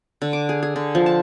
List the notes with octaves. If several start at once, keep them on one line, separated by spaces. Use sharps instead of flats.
D3
D6
G#4
G#4
D3
F3
A5